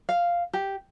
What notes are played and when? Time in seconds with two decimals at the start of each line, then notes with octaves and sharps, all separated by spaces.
0.09 F5
0.53 G4